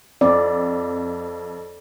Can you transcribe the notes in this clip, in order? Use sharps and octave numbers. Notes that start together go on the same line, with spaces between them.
F2 C4 D5